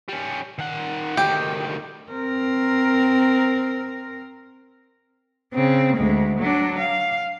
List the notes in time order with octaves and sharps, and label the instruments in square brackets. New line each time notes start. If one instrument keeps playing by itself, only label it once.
[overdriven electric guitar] G3 C#4
D#3 F#5
[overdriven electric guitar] D2 D#3 [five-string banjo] G4
[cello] C4 A#4
C#3 C4
D2 G#3
F#3 D4
F5